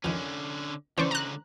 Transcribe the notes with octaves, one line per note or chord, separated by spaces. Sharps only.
F2 D3 D#3 C#4
C#2 D3 E3 C#4 C5 D5 C#6
A#5 F#6